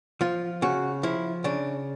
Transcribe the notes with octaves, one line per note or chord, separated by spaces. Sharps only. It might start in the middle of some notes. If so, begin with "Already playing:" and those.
F3 F4
C#3 F#4
F3 E4
C#3 D4